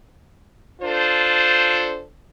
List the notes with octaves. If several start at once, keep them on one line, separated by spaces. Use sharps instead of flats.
D4 F4 A4 C5